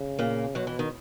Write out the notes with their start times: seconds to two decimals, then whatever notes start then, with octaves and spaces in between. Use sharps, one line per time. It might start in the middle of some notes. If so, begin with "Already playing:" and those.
Already playing: C#3
0.19 A#2 A#3
0.55 F#2 B2 F#3
0.67 E3
0.79 D#3